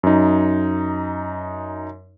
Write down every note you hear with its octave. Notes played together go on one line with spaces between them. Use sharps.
F#2 D#4